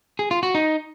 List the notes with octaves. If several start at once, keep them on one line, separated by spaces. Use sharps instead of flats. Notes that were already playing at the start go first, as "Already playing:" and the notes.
G#4
F4
F#4
D#4